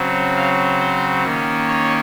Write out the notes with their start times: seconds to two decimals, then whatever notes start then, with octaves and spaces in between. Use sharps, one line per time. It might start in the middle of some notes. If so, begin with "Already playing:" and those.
Already playing: C#3 F#3 C4
0.36 F5
0.80 C5
1.24 D#3 A#3 C#4
1.68 C#5